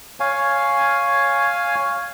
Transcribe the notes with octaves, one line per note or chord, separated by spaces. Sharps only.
C#5 F5 G#5